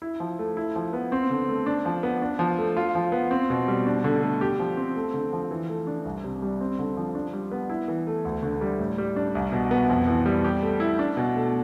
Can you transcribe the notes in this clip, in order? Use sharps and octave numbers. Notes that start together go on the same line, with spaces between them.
E4
F3
A3
E4
F3
B3
C4
D3
A3
D4
F3
B3
D4
F3
A3
F4
F3
B3
C4
B2
G3
D4
D3
A3
G4
F3
C4
A3
D3
F3
E3
A3
D4
C2
C3
G3
C4
D3
F3
D4
G3
B3
E4
E3
A3
D2
D3
G3
A2
G3
D4
C2
B2
B3
F2
E3
G3
G4
A3
E4
D4
B2
A3